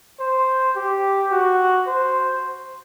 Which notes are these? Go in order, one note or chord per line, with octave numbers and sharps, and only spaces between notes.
C5
G4
F#4
C5